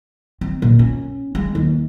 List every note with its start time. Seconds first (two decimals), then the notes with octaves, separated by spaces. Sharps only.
0.41 C4
0.62 A#2
0.79 C#4
1.35 G#3
1.55 D#2